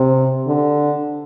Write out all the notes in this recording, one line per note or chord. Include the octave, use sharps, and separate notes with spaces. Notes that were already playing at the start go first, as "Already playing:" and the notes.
Already playing: C3
D3